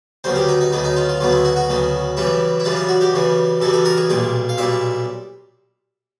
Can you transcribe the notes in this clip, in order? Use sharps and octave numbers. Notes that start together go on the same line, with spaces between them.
D2 C#3 F#3 B3 C5
G4
D#4
D#4
D2 C#3 F#3 B3
D#4
F4
F4
D2 C#3 F#3 B3 F4
E4
F#4
F#4
D2 C#3 F#3 B3
F#2 C#3 E3 G3 E4
E4
F#2 C#3 E3 G3 F4
F4
F#4
G4
F#2 C#3 E3 G3
F#2 C#3 E3 G3 A4
A4
A#4
G#4
B1 A#2 G3 G#4
F5
B1 A#2 G3 E5